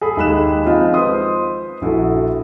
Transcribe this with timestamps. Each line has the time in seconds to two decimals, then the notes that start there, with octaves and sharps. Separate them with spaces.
0.01 G#4 A4 B5
0.17 D#2 G#3 G4 B5 F#6 E7
0.66 F3 G#3 C4 D#4 F4
0.94 B4 C5 C6 D#6
1.81 A#1 E4 F#4 A4